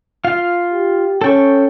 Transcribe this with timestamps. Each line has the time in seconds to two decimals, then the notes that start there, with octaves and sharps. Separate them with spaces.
0.24 F4 F5
0.73 G4
1.21 C#4 A4 G5 C#6